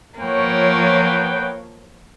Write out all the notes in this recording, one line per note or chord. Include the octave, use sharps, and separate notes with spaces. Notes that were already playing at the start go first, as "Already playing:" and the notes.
F3 A#3 B3 B4 C#5 G5